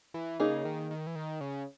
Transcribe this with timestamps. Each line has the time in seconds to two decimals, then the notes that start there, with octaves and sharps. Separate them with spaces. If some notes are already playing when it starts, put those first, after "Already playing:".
0.14 E3
0.39 C#3 A#3 D#4 G#4
0.65 D#3
0.91 D#3
1.07 E3
1.15 D#3
1.41 C#3